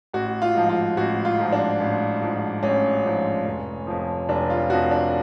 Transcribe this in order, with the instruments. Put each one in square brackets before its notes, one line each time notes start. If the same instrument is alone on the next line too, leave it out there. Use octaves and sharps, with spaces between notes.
[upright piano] A1 F#4
F4
G#2 F3
F4
A1 F#4
F4
G#2 F3
D4
A1
G#2 F3
A1 C#4
G#2 F3
F1
F2 F3
F1 D4
F4
F2 F3 F#4
D4